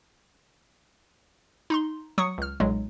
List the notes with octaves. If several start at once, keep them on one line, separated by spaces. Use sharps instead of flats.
D#4 A#5 C6
F#3 C#6 D#6 C#7
C#2 F6
B1 A#2 F#3 G#3